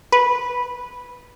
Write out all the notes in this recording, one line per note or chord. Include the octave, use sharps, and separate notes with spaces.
B4